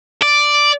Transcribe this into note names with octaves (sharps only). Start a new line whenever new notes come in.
D5